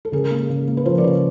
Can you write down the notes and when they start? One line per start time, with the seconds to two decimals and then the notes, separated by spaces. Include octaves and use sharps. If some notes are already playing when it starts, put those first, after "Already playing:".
0.05 A4
0.12 C#3 G#4 A#4
0.31 A#3
0.50 C#3
0.68 A#3
0.77 B4
0.85 F3 A#4 C5
0.98 D5
1.03 C#3 B4 C#5